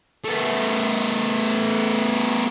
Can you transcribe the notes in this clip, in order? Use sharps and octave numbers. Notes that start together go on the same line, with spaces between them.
A3 B3